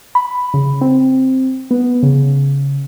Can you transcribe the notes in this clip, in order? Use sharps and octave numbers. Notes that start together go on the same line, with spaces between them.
B5
C#3
C4
B3
C#3